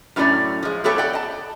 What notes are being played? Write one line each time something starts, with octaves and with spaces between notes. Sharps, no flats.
F#2 A2 B3 C#4 D5 A#5
F3 G#3
A3 B3 G4 A4 C#5 G5
D5 F#5 G5
D#5 A5